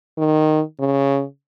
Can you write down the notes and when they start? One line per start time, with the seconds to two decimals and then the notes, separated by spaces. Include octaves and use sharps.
0.18 D#3
0.80 C#3